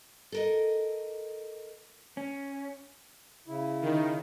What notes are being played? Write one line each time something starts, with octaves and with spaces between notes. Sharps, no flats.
A4 A#4 D#5
C#4
C#3 E4
D#3